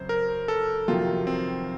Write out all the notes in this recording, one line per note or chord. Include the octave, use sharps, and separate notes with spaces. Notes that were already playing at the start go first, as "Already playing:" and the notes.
Already playing: F#2 C#3 C4 C5
A#4
A4
F2 C3 D#3 F#3 F4
C4